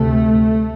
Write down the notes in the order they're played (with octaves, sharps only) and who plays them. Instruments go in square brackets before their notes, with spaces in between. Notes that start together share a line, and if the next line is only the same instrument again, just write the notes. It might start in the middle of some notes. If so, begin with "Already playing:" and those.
Already playing: [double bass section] D2 C3 A3